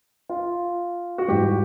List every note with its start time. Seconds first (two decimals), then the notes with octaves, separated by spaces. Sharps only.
0.29 F4
1.18 F#4
1.28 G#2 E3 G3 G4